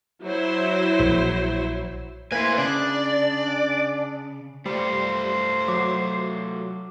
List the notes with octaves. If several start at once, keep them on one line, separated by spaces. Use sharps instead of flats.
F#3 E4 C5
A#1
A#3 E4 B4 C5 G#5
C#3 D4 D5
G3 A3 F4 C5
F#3 D6